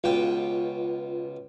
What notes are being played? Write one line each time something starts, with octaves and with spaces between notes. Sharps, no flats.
C#2 B2 F4 G5